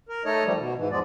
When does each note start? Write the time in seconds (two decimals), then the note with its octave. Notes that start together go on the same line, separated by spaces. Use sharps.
0.09 A#4
0.25 A3 D#4 A4 C#5 D#5
0.44 D#3 F3 G3 A3
0.58 B2
0.77 G#2 E3
0.91 E2 F3 G#3 B3 D5